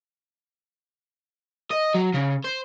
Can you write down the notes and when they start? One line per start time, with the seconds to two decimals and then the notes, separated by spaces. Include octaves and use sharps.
1.71 D#5
1.95 F#3
2.15 C#3
2.45 C5